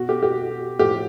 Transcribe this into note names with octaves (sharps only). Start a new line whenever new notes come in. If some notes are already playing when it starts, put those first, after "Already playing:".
Already playing: B2 F#4
G4
G4
A2 F3 G4